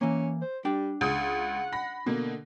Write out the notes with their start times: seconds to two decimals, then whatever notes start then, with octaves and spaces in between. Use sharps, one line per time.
0.01 E3 A#3 C#4
0.41 C5
0.65 G3 D4 G5
1.01 C#2 F#5 D#6
1.72 B5 A#6
2.06 B2 D3 A#3